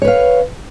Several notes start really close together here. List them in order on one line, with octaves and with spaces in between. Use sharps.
C#5 B4 F5